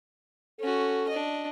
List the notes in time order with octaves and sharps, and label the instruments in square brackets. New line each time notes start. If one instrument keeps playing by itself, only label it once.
[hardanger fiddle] C#4 F#4 [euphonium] A4
[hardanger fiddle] D4 D#5